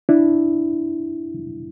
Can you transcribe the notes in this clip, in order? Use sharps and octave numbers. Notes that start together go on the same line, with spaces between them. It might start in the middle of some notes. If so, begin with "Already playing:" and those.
D4 E4